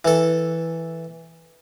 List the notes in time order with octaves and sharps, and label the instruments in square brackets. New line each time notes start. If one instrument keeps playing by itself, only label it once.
[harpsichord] E3 A4